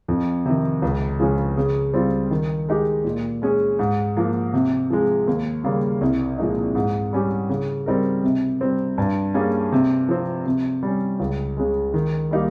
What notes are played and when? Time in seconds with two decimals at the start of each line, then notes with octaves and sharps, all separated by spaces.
0.08 F2
0.46 C3 D#3
0.82 C#2
1.20 C#3 F3 G#3 C#4
1.57 C#3
1.94 G3 C4 F4
2.31 D#3
2.69 G#3 D#4 G4
3.04 A#2
3.42 G#3 C#4 G#4
3.79 G#2
4.17 F3 A#3
4.54 C3
4.90 F3 G#3
5.28 D#2
5.64 C#3 G3 A#3
6.01 C2
6.38 A#2 F3 G#3 D#4
6.75 G#2
7.13 G3 C#4 G4
7.49 C#3
7.86 G3 C4 D#4 A#4
8.24 C3
8.61 G3 C4
8.98 G2
9.34 G3 A#3 C#4 G#4
9.72 C3
10.09 F3 C4
10.46 C3
10.83 G3 C#4
11.20 C#2
11.57 C#3 G#3
11.94 D#3
12.31 G3 A#3 D#4 G4